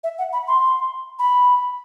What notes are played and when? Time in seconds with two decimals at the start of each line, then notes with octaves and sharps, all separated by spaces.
0.04 E5
0.18 F#5
0.33 B5
0.48 C6
1.19 B5